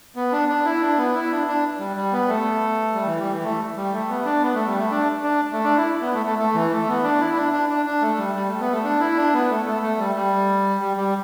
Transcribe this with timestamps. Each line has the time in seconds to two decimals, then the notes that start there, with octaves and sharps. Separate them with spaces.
0.16 B3
0.32 D4
0.49 D4
0.65 E4
0.81 D4
0.98 B3
1.15 E4
1.31 D4
1.47 D4
1.79 G3
1.96 G3
2.13 B3
2.29 A3
2.95 G3
3.06 E3
3.19 G3
3.31 E3
3.44 A3
3.76 G3
3.93 A3
4.09 B3
4.25 D4
4.42 B3
4.54 A3
4.67 G3
4.79 A3
4.91 D4
5.24 D4
5.52 A3
5.65 D4
5.77 E4
6.01 B3
6.14 A3
6.26 A3
6.39 A3
6.55 E3
6.71 A3
6.88 B3
7.04 D4
7.21 E4
7.37 D4
7.53 D4
7.69 D4
7.86 D4
8.02 A3
8.18 G3
8.35 G3
8.48 A3
8.60 B3
8.72 A3
8.84 D4
9.00 E4
9.17 D4
9.34 B3
9.50 A3
9.66 A3
9.82 A3
9.99 G3
10.15 G3
10.80 G3
10.97 G3